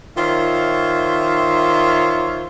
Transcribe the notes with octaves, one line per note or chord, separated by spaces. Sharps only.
D#3 F4 C5 C#5 E5